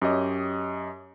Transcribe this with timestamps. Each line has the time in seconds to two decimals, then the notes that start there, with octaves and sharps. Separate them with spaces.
0.02 F#2 G4 C#5 D#5